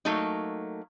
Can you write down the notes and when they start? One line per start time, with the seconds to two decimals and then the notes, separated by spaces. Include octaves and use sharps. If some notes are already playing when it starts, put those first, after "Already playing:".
0.05 F#3 A3 A#3 D#4